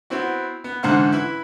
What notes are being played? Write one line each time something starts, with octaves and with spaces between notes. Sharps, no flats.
B3 C4 E4 F#4
B3
A1 G#2 D3 C5 F#5 F6
E4 B4